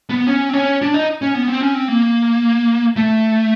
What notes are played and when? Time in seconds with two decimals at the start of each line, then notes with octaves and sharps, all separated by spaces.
0.09 B3
0.27 C#4
0.49 C4
0.54 C#4
0.82 D4
0.94 D#4
1.22 C#4
1.35 B3
1.48 C4
1.61 C#4
1.74 C4
1.88 A#3
2.96 A3